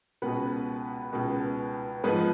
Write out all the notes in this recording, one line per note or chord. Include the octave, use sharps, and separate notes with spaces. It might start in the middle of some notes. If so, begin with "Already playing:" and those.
C#2 B2 B3 B4
C#2 B2
G#2 F3 B3 B4